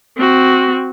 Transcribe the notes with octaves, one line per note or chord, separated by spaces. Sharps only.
C4 F#4